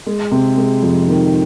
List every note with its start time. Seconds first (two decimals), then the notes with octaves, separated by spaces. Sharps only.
0.06 G#3
0.31 C3
0.57 G#3
0.83 F2
1.08 D#3